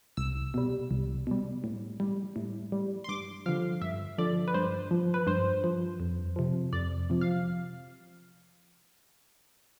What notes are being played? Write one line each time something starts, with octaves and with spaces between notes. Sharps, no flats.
C2 E6
B2 G3
C2
B2 G3
A2
G3
A2
G3
C6
G2 D6
D3 F3 F5
G2 E5
D3 F3 D5
B4
G2 C5
F3
B4
G2 C5
F3
F2
C3 F3
F2 D5
C3 F3
F5